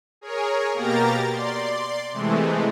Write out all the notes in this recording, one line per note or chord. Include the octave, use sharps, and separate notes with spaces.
G#4 A#4 C#5
B2 A#3 G4 A#4 A#5 A6
D5 C6
C3 E3 G#3 A3